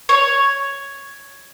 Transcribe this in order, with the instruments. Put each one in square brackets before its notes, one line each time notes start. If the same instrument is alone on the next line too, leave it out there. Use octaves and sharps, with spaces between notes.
[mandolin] C#5